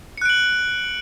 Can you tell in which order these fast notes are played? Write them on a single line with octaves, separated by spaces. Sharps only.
C#7 F#6 D7 F#7